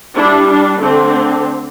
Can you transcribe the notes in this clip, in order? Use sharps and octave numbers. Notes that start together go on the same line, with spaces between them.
G3 D4 E4
D4
D3 A3 C4